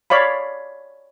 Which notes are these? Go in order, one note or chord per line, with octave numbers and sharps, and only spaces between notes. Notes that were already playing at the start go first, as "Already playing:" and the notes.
C#5 D5 F5 B5